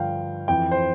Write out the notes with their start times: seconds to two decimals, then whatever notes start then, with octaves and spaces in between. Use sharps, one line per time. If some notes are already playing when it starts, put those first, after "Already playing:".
Already playing: G2 D3 F3 F5 G5
0.48 F2 E3 G5
0.71 C5